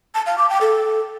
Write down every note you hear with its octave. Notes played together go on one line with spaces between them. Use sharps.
A5
F5
D6
G5
A4